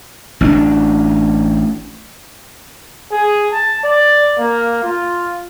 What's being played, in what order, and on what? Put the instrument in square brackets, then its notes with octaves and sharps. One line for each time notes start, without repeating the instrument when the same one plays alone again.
[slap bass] A1 C4 D4
[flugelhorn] G#4
A5
D5
A#3
F4